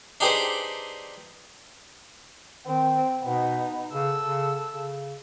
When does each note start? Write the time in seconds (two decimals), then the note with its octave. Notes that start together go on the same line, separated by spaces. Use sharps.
0.20 D4 D#4 G4 G#4 B4 C5
2.67 D#3 C4
3.24 B2 B3 D#4
3.93 C#3 A4 E6
4.24 C#3
4.72 C#3